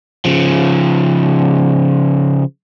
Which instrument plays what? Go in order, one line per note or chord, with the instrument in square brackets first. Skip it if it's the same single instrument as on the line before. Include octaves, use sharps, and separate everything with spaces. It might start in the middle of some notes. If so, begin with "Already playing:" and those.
[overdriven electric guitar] C#3 F3